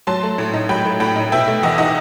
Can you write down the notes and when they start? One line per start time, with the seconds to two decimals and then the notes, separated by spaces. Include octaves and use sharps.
0.07 F#3 A5 C6
0.23 A3
0.38 A2
0.54 D#4
0.69 F#3 G5 B5
0.85 A3
1.00 A2 G5 B5
1.16 D#4
1.32 B2 E5 G5
1.48 A3
1.63 E2 D#5 F#5
1.78 D#4 D#5 F#5